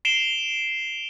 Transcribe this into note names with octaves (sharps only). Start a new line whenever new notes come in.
C7 D7 E7 F7 G7